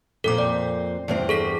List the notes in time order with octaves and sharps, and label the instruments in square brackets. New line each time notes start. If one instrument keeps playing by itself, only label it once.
[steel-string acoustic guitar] F2 A#2 C4 [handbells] A4 D6
[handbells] D5
[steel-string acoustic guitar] E2 G2 C4
[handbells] G#4 A4 B6